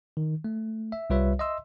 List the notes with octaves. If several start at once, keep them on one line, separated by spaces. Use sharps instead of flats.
D#3
A3
E5
C2 G3 F4 B4 C#5 E5
D#5 E5 C6 E6